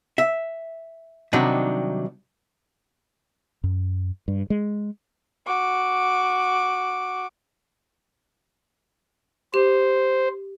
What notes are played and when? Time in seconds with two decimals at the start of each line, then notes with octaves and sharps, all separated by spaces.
0.18 E5
1.33 C3 D#3 F#3 G3 D4 D#4
3.64 F#2
4.28 G2
4.50 G#3
5.46 F#4 D6
9.54 G4 C5